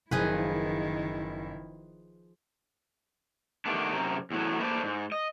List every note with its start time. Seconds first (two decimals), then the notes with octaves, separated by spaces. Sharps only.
0.11 F#1 D#3 F3 E4 G#4 B4 G6
3.66 D#3 G3 A3 B3 D4
3.92 F#2 C3 A#4
4.31 E2 A2 F#3
4.59 A3 A#3 D4 B4 C5 D5
4.84 G#2
5.12 D#5